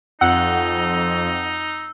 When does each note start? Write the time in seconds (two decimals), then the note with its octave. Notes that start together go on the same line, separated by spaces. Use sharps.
0.21 F2 D#4 F#5 E6